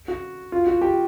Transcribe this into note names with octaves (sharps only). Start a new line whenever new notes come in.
F#4
F4
F#4
G4